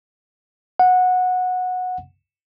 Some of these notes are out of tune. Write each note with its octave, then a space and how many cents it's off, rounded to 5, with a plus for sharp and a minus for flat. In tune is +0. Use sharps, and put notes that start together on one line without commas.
F#5 -15